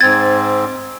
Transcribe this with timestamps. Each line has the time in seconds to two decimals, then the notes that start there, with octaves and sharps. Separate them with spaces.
0.01 G#2 C4 G#6 A6